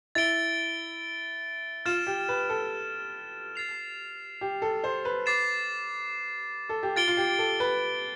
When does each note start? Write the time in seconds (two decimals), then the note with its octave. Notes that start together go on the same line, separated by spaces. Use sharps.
0.15 E4 A6 D7 G7
1.85 F4 F6 A6 E7
2.07 G4
2.29 B4
2.49 A4
3.56 A6 C7 F7
4.41 G4
4.62 A4
4.84 C5
5.05 B4
5.26 D6 A6 C7 E7
6.69 A4
6.83 G4
6.96 F4 A6 D7 G7
7.08 F4
7.17 G4
7.39 A4
7.60 B4